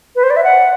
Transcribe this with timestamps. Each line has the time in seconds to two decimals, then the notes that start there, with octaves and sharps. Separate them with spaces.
0.16 B4
0.23 C5
0.30 D5
0.37 E5
0.44 F#5